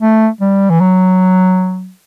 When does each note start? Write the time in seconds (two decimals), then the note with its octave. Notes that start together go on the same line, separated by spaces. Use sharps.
0.01 A3
0.41 G3
0.70 E3
0.81 F#3